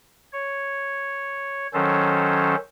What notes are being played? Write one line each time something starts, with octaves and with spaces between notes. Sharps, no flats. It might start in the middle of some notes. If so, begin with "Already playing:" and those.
C#5
D#3 F#3 C#4 A4 C5